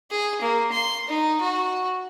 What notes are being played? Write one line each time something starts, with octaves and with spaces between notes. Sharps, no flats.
G#4
A#3
C6
D#4
F#4